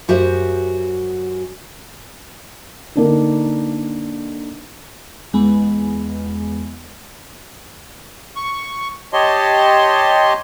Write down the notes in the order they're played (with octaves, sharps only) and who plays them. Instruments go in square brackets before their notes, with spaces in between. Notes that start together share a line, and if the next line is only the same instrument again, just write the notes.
[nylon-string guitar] F#2 F#4 G4 C5 E5
[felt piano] D3 A#3 D4 D#4
[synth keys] E2 G#3 B3
[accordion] C#6
G4 C#5 D#5 A5 C6